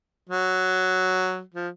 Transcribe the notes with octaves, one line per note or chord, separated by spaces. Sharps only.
F#3
F3